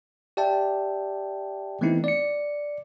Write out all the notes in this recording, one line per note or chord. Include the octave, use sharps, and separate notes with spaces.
G4 D5 E5 G5 A5
E3 A3 B3 C4 D#4 E4
D5 C#7